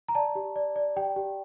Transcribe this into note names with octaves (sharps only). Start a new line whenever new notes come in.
A#5
D5 A5
G4
D5
D5
G4 G5
G4